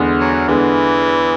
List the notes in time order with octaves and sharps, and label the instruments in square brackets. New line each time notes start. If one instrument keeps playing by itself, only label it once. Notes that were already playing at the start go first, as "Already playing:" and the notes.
Already playing: [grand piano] E2 D3 G#3 B3
[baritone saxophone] F#3
[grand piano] E2 D3 G#3 B3 [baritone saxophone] E3